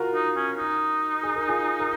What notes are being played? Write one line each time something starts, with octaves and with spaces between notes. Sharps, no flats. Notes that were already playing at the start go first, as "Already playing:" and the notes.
Already playing: F4 F#4 A#4
D#4
C#4
D#4
G#4
A#4
F4 G#4
A#4